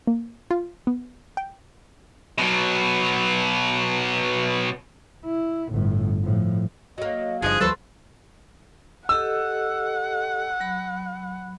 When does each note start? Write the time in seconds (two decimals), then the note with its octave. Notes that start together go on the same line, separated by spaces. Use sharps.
0.07 A#3
0.51 F4
0.87 B3
1.37 G5
2.39 B2 F#3
5.25 E4
5.72 G1 A2
6.24 A2 F3
6.98 F#3 A#3 D#5
7.42 F#1 G2 F3 D#4 G#4 D#5 F#6
7.60 D#2 F3 G3 A3 A4 B4 C5
9.09 G4 A4 D#5 F#5 E6
10.60 F#3 B5